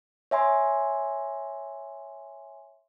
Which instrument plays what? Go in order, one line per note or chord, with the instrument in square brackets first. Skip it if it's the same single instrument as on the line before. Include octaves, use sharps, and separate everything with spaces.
[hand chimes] C#5 E5 G#5 C6